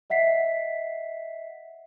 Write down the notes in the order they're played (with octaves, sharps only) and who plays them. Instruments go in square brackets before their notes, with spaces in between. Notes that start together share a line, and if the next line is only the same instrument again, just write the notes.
[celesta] D#5 E5 F#5 B6 C7